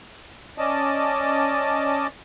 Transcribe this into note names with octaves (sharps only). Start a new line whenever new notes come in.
C#4 D5 D#5 A5